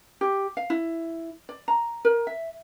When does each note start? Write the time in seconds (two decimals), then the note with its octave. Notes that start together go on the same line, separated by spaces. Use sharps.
0.21 G4
0.57 F5
0.70 E4
1.49 D5
1.68 A#5
2.05 A#4
2.27 E5